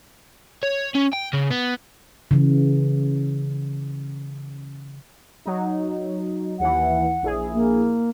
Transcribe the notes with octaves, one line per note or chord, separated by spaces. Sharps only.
C#5
C#4
G5
C#3
B3
C#3 E3
F#3 D#4
D#2 E3 F#5
A#1 E4 G#4
A#3